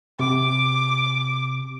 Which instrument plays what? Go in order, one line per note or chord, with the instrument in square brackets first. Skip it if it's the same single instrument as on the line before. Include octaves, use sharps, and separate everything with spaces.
[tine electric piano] C3 [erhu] D6